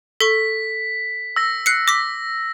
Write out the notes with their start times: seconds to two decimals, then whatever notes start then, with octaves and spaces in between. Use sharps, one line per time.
0.21 A4 C#6 B6
1.36 E6 A#6
1.66 F#6 C7 C#7
1.88 D6 A#6 B6